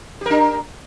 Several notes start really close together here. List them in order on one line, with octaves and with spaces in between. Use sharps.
G4 A#4 D4